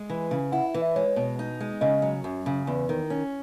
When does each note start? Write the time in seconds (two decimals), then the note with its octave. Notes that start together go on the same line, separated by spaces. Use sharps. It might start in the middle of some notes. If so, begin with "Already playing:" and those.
Already playing: G#3
0.10 E3
0.31 C#3
0.52 E4 F#5
0.67 E5
0.74 E3
0.82 E5
0.96 G#3 C#5
1.16 B2
1.39 D#4
1.60 G#3
1.81 C#3 D#5
2.02 F#3
2.24 F#2
2.46 C#3
2.67 E2 B4
2.89 D#3
3.10 C#4